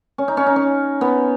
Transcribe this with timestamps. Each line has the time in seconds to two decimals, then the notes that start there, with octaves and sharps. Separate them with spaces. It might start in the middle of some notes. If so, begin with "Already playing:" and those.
0.18 C#4
0.28 D#4
0.37 C#4
0.46 D#4
0.56 C#4
1.01 B3